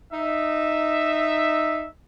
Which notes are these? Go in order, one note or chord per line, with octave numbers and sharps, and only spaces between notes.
D#4 E5